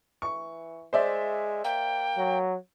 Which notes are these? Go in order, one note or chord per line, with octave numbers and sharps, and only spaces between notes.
E3 C#6
G#3 C5 D5 E5
A#3 G5
F#3